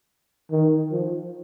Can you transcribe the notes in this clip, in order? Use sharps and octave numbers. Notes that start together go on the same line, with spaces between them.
D#3
F3